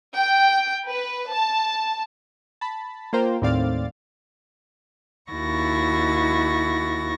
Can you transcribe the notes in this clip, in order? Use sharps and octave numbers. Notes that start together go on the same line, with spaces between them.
G5
B4
A5
A5 B5
A#3 F4 A#4 C5 F5 G5
D#2 A2 C4 D5 F5 A6
D#2 E4 F#4 C#6 A6 A#6